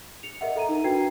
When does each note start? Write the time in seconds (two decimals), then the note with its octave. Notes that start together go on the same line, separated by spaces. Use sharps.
0.23 C#7 F7
0.41 A#4 D#5 E5 F#5
0.56 A4 A#5 D#7
0.69 D#4 A#4
0.84 D4 F#4 B4 G5 G#6 C7